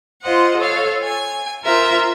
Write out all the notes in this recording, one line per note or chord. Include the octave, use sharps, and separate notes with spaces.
F4 C5 D#5 F#5
A4 C#5 F5
G#5
F4 A#4 C5 E5